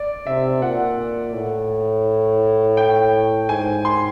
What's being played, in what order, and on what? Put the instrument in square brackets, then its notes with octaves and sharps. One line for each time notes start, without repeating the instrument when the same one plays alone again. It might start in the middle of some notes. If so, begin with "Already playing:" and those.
Already playing: [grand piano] D5
[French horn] C3 [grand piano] E5
[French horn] A#2 [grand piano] F#5
[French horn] A2
[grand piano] G5
[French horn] G#2 [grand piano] G#5
[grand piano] C6